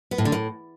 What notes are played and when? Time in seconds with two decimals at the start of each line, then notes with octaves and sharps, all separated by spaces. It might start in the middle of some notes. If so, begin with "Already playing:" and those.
0.11 B3
0.18 A2
0.25 D3
0.32 A2